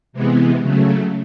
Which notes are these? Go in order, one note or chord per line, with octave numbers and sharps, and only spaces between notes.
C3 E3 G#3 B3
C#3 F#3 A3